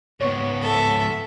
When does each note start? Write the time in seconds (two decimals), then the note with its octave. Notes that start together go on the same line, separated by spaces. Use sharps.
0.21 C#2 G#2 B3 C#5 C#6
0.62 A4 E5